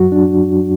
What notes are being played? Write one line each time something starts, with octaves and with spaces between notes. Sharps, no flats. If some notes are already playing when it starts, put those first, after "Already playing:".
Already playing: F#2 F#3 F#4
D4